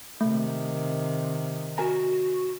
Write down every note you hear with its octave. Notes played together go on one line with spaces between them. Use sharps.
C3 D#3 A3
F#4 A#4 G#5 A#5